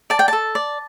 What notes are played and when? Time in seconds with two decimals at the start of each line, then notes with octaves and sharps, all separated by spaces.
0.10 D5 A5
0.19 G5
0.28 A4 A5
0.55 D5